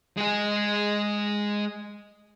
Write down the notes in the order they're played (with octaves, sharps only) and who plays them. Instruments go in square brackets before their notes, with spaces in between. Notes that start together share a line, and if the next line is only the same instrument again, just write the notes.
[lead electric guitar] G#3 G#4